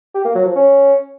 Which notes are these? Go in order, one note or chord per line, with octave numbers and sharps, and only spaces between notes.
G4
A#3
F#3
F3
C#4